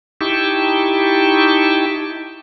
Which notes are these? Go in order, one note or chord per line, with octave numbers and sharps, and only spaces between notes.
D#4 E4 G4 G5 A5 C#6